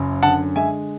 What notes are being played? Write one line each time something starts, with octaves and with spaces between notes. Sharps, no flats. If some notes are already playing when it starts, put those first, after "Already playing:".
Already playing: F#1 F#2
D3 F#5 A5
G#3 E5 G#5